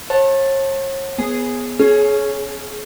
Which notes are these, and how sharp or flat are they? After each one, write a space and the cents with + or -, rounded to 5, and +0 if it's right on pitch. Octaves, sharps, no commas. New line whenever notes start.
C#5 -40 F#5 +0 A5 +0
B3 +0 G#4 +0
C#4 +0 G#4 +30